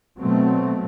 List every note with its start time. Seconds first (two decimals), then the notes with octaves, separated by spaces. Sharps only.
0.20 B2 F#3 A3 C4